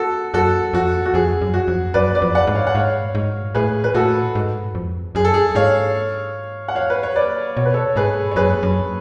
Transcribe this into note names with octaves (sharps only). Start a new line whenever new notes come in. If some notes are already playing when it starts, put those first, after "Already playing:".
Already playing: F#4 A4
F#2 F#4 A4
F2 F#4
F#4
F2 G#4
F#2
F#4
F2
F#2 B4 D5
B4 D5
F2
D5 F#5
G#2
C#5 F5
F#5
G#2 C#5 F5
G#2
A2 G#4 B4
B4
A2 F#4 A4
G#2
F2
F#2 G#4
A4
G#4
G#2 C#5 F5
F#5
C#5 F5
B4
C#5
B4 D5
B2 C#5
B4
A4 C#5
G#2 G#4 B4
C#5
F#2 G#4 B4
F#2